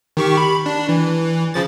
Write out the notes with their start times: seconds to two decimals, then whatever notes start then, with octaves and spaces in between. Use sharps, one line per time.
0.17 D#3 G4 C#6
0.37 B5
0.66 D4
0.89 E3
1.54 C#3 F3 A6